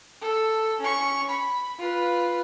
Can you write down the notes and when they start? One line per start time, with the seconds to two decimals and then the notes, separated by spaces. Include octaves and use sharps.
0.21 A4
0.80 C#4 C#6
1.29 B5
1.78 F4 B4